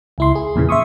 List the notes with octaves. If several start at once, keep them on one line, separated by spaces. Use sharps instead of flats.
C#2 E4 C6
G#4
E2 A#2 C#3 E3
E5 C6 C#6 D#6